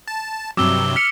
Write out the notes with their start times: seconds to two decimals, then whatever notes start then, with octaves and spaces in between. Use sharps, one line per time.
0.08 A5
0.57 G2 C3 F#3 D6 E6 G7
0.96 F6 B6 C#7